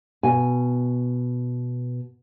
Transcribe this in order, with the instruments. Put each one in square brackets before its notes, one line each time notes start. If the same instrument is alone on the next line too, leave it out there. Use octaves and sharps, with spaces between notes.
[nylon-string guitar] B2 G#5